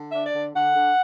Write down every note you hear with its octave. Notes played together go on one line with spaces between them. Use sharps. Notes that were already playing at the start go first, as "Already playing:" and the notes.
Already playing: D3
E5
D4
D5
D3
D3 F#5
D3